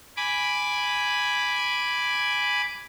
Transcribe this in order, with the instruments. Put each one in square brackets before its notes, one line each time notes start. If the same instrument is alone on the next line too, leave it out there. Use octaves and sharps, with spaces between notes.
[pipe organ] G#5 B5 D6